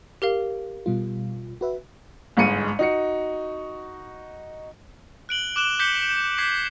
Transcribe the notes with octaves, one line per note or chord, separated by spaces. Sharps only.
G4 A#4 F5
B2 G3 F4
F#4 B4 E5
G1 G#2 G#3 C#7 D#7
D#4 F#4 C#7
F#6 D7 F#7 G7
D6 F#6 E7 F#7 G7
D6 G6 B6 C#7 G7
D6 G#6 B6 C7